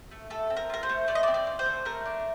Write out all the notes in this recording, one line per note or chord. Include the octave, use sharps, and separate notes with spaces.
A3
A3 A4
C4
A#4
F4 A#4
C5
A3
A3 D5
D#5
D5
C4
D5
F4
C5
A3
A3 A#4
D4